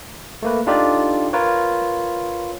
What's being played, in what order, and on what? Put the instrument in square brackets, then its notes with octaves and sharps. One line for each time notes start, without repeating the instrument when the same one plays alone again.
[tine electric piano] A3 A#3 B4
D4 D#4 F4 G4 A4 D5
F4 A#4 B4 C#5